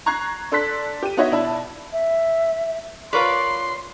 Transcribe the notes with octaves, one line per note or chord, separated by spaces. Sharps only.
A#5 C#6 F#6 G#6 C7
D4 A4 C6 F#6 B6
G4 D#7
B3 D#4 F#4 C#5 D#5 E5
B2 D4 E4 A5 B5
E5
F4 A#4 B4 C#5 D5 C6